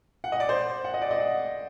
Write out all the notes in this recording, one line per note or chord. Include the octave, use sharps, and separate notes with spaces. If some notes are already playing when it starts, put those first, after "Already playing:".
F#5
D#5
D5
C5
F#5
D#5
D5
D#5
F#5